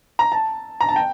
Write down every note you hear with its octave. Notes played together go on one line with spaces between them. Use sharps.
A#5
A5
A#5
A5
G5